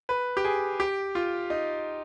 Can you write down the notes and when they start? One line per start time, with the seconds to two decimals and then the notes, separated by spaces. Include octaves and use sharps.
0.09 B4
0.37 G4
0.45 G#4
0.80 G4
1.15 F4
1.50 D#4